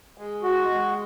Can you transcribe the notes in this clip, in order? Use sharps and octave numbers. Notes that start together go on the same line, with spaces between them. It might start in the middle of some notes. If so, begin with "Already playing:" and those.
G#3
F#4
G#3